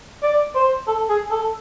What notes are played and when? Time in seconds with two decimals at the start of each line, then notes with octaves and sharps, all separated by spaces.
0.23 D5
0.55 C5
0.87 A4
1.09 G#4
1.31 A4